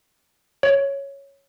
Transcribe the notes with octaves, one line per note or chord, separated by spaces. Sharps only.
C#5